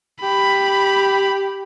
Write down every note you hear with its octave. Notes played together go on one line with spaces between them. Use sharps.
G4 B5